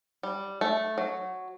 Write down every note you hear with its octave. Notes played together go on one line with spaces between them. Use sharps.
G3
A3
F#3